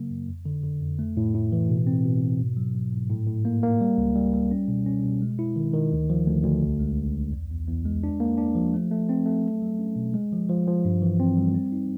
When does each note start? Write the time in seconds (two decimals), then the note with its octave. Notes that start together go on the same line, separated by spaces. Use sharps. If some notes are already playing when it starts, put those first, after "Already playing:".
Already playing: C#3 F#3 A#3
0.10 F#2
0.29 F2
0.46 D3
0.63 D3
0.82 F2
0.99 A3
1.17 A2
1.34 A2
1.52 E3
1.69 B2
1.87 C4
2.05 B2
2.22 B2
2.39 G#2
2.57 F#3
2.75 F#3
2.92 G#2
3.10 A2
3.27 A2
3.45 A#3
3.63 A#3
3.81 G3
3.98 C#2
4.15 G3
4.34 G3
4.51 C#4
4.68 B2
4.86 C#4
5.04 B2
5.22 G#3
5.39 E4
5.56 D#3
5.74 D#3
5.92 D2
6.10 F3
6.26 D2
6.45 D2
6.62 C2
6.80 G#3
6.97 C2
7.16 C2
7.32 E2
7.50 E2
7.67 E2
7.85 G#3
8.04 D4
8.20 A#3
8.38 D4
8.55 F3
8.74 A3
8.91 A3
9.09 C4
9.26 A3
9.44 F#3
9.62 F#3
9.79 C#4
9.96 B2
10.14 G#3
10.32 F3
10.49 F3
10.68 F3
10.85 G2
11.02 E3
11.20 C4
11.38 G3
11.55 C4
11.72 D#4